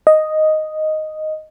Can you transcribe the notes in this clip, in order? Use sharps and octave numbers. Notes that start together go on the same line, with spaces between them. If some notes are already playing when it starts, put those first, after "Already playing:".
D#5